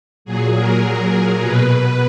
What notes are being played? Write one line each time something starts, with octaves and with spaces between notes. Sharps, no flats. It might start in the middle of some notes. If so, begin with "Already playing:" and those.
A#2 F#3 G#4
A#4
B2 B4